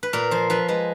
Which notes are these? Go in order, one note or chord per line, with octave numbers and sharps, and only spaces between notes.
B4
A#2 A#4
F3 C5
F3 B4
G#3 B4